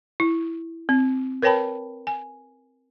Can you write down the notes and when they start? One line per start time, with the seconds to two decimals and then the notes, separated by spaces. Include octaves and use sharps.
0.20 E4
0.89 C4
1.42 A#4 B4 C#5 G5 A5 B5
2.07 G#5